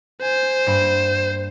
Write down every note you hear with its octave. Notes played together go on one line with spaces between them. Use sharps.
C5 G#5
G2 A#3 B5